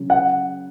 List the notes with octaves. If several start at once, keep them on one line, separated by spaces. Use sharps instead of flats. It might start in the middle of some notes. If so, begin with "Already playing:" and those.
Already playing: C#3 F#3
F#5